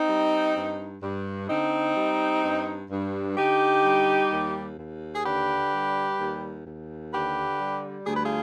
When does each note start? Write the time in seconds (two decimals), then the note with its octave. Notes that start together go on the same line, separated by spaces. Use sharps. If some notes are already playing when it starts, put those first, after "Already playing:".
Already playing: C4 D#4
0.09 G3
0.55 G2
1.02 G2
1.49 D3 C4 D#4
1.96 G3
2.44 G2
2.91 G2
3.37 D3 D#4 G4
3.84 G3
4.31 D#2
4.79 D#2
5.15 G#4
5.25 D3 G4 B4
5.73 G3
6.19 D#2
6.66 D#2
7.13 D3 G4 B4
7.60 G3
8.07 D2 G#4
8.16 B4
8.26 F4 G#4